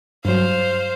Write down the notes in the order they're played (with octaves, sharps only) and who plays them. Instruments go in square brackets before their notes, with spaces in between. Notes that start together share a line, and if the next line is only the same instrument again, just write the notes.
[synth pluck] G2 F#3 [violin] C5 F5